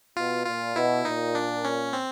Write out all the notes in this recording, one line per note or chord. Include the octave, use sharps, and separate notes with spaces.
B2 F4
A#2 F4
B2 E4
A#2 D#4
D4
C#4
C4